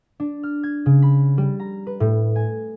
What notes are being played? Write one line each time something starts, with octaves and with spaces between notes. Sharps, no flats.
D4
F6
G#6
C#3
B5
G3
A#5
B4
A2
G#5